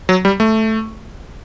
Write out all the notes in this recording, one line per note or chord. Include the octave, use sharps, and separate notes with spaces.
F#3
G3
A3